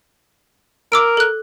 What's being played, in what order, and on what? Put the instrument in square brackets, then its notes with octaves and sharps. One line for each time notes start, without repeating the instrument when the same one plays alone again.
[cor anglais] A#4 [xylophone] D6 E6 D7
[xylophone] A4 F#6